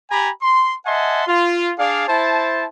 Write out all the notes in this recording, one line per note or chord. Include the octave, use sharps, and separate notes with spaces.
G4 G#5 A#5 B5
C6
D#5 E5 F#5 G#5 A5 C6
F4
D4 G#4 D5 F5
E4 C5 A5